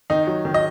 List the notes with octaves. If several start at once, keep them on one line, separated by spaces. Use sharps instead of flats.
D#3 D#4
F#3
D#3
D#5